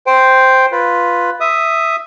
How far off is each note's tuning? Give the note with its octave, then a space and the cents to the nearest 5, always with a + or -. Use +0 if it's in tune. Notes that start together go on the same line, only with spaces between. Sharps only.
C5 +0 G5 +0
F4 +0 B4 +0
E5 +0 D#6 +0